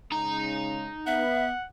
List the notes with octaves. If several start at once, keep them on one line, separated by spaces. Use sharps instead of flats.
C#3 G#3 D#4 A#5
B3 E5 F#5